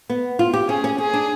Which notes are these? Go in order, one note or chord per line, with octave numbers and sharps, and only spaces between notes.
B3
F4
G4
C#4 G#4
C#4
C#4 G#4
D4